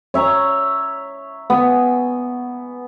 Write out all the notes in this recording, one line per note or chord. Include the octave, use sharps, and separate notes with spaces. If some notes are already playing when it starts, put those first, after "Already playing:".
C#5 E5 A#5 C#6
B3 G#5